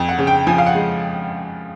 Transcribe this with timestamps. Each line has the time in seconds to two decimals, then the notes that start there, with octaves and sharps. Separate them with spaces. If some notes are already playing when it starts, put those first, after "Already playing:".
Already playing: F2
0.09 F#5
0.19 C#3
0.27 G5
0.47 F3 G#5
0.58 F5
0.66 F#5
0.75 G#3